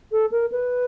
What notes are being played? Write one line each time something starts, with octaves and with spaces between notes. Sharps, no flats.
A4
A#4
B4